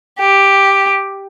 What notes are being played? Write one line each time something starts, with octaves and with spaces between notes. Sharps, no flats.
G4